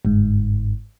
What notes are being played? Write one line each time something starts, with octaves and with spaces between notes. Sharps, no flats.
G1 G#2